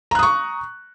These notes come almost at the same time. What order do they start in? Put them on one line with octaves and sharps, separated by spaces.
A#5 F#6 D#6 C#6